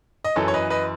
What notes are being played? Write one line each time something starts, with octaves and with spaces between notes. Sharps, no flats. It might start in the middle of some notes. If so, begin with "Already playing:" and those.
D#5
F#2 E3 A4 C#5
C#5
B4 D#5
B4 D#5